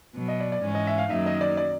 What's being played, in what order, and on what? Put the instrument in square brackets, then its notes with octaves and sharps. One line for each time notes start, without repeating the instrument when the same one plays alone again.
[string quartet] B2 F#3 B3
[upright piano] D#5
D5
D5
[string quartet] G#2 E3 G#3 C#4
[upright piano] D#5
E5
F5
[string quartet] F#2 D#3 F#3 A#3 D#4 [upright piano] E5
[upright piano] D#5
D5
D5